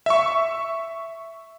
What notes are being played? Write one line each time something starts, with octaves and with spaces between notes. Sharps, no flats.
E5 C#6